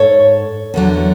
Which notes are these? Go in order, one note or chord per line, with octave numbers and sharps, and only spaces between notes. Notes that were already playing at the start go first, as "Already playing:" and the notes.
Already playing: G#2 A4 C#5
E2 D3 F#3